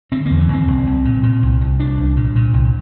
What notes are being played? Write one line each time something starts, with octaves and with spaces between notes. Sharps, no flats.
D3 C4
A#3
E2
E3
E2 C4
C2
C2
A#2
A#2
C2
C2
C2 D4
C2
A#2
A#2
C2